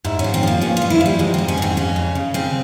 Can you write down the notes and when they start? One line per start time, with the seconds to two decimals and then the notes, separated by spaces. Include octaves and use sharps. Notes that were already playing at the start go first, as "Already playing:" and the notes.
0.04 G#2 E4
0.19 C#4
0.24 F3
0.34 C4
0.43 F3 A#3
0.61 G2 C#4
0.77 F3 F4
0.90 E4
1.01 F3
1.06 G3
1.19 G#2 G#3
1.34 G#2 C4
1.48 C#4
1.57 G#2 C4
1.77 F2 C#4
1.96 C#3
2.15 C#3
2.34 C#3 C4